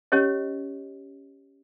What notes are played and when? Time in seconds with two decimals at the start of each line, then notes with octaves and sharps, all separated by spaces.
0.12 C#4 G4 C#5 D#5